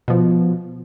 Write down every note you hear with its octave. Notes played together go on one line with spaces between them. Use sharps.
B2 F3